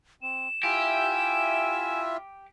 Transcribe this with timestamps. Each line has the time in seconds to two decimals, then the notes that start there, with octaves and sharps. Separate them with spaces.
0.23 C4 E7
0.63 E4 F4 G4 E5 G#5